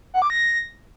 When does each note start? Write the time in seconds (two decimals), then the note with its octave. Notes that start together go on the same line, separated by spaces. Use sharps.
0.14 F#5
0.22 D6
0.30 A#6